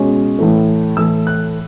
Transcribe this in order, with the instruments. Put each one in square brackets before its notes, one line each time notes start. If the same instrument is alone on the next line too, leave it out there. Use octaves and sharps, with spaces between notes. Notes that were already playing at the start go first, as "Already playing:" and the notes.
Already playing: [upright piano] B2 G#3 C#4
A2 E3 A3
A2 E3 A3 E6
F#6